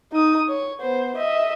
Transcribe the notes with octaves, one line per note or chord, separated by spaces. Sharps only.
D#4 D#6
C#5
B3 C5
D#5 E5